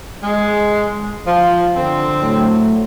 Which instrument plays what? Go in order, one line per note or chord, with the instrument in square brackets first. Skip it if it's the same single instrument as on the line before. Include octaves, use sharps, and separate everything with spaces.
[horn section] G#3
F3
D3 C4
[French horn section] A2 F#3 A3